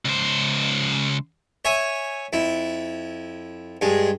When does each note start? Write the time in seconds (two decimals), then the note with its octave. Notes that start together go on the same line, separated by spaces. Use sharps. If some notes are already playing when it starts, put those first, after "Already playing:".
0.05 C#2 C5
1.65 C#5 E5 G#5
2.33 F2 E4
3.81 G2 G#3